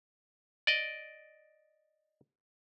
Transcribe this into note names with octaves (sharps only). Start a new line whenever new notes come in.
D5 D#5